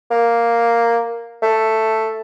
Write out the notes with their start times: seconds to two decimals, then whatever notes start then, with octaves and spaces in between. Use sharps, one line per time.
0.11 A#3
1.42 A3